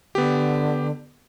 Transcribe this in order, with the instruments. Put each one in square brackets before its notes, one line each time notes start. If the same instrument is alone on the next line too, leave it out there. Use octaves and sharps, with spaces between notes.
[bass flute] D3 [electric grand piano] B3 G4